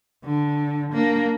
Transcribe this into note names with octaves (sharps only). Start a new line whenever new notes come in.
D3
A#3 D4